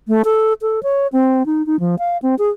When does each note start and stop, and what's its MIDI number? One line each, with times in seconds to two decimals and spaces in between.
0.08 0.22 57
0.25 0.53 69
0.62 0.80 69
0.83 1.07 73
1.13 1.46 60
1.46 1.65 63
1.67 1.79 63
1.80 1.95 53
1.99 2.18 77
2.22 2.35 60
2.39 2.50 68